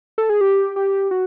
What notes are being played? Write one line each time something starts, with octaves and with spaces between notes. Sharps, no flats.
A4
G#4
G4
G4
F#4